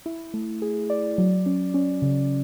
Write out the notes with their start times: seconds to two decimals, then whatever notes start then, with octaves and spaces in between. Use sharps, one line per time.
0.06 E4
0.34 A3
0.62 G#4
0.90 D5
1.18 F#3
1.46 C#4
1.74 C#4
2.02 C#3